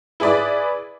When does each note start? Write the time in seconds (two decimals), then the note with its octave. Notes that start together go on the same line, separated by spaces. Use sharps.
0.20 E4 G#4 B4 D5